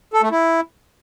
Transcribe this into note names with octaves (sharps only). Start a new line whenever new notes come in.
A4
A3
E4